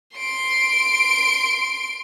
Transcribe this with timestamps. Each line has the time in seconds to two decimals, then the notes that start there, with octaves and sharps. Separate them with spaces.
0.17 C6 D7